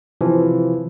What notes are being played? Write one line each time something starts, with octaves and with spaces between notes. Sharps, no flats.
C3 E3 F3